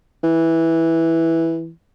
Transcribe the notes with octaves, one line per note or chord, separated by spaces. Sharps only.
E3